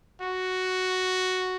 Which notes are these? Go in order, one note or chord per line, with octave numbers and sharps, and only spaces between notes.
F#4